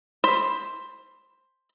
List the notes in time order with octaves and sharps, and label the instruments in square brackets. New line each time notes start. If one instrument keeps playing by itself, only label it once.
[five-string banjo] C5 B5